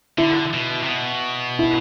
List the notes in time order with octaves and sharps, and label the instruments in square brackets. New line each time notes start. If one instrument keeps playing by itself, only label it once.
[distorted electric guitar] D3 [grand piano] E4
[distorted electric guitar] B2
C3
B2
[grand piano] E4